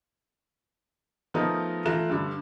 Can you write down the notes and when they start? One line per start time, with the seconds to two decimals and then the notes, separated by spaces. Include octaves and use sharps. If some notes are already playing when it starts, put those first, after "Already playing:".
1.34 F3 A3 B3 D#4 A#4 D#5
1.85 E3 A3 F4 A#5 F#6 E7
2.10 G2 D3